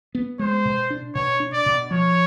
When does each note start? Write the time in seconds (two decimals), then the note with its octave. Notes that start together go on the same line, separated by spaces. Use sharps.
0.15 B3
0.39 G#3 C5
0.65 B2
0.90 D4
1.15 B2 C#5
1.40 D4
1.53 D5
1.66 B2
1.90 F3 C#5